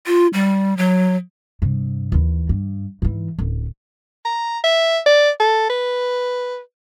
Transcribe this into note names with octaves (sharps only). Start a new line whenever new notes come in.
F4
G3
F#3
G2 C3
D#2 E3
G2
G#2 E3
D1 C#4
A#5
E5
D5
A4
B4